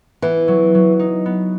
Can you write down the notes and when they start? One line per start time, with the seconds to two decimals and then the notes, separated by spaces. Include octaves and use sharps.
0.22 E3 B3
0.48 F#3
0.75 F#3
0.99 D#4
1.26 B3